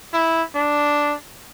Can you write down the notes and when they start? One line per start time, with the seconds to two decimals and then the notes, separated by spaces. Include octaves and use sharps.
0.13 E4
0.55 D4